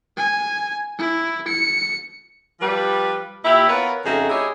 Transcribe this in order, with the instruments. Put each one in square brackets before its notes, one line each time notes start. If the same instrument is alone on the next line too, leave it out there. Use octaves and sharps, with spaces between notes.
[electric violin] G#5
E4
C#7
[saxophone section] F3 G3 B4
A#2 E4 G4
B3 F4 A#4 B4 C#5
F2 C#3 A3 D#4 F#4 G#4
D#4 E4 G4 G#4 C#5 D#5